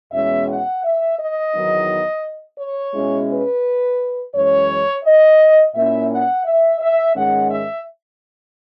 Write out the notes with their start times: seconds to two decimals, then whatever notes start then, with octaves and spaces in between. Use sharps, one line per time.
0.12 E2 B2 G#3 C#4 E4 E5
0.47 F#5
0.83 E5
1.18 D#5
1.53 E2 D#3 F#3 B3 D#4
2.58 C#5
2.93 B2 G#3 C#4 E4
3.28 B4
4.34 F#2 E3 G#3 C#4 C#5
5.04 D#5
5.74 A#2 A#3 C#4 E4 E5
6.10 F#5
6.45 E5
6.80 E5
7.15 G#2 D#3 G#3 C#4 F#5
7.50 E5